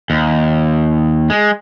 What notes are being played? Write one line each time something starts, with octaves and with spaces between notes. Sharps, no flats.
D#2
G#3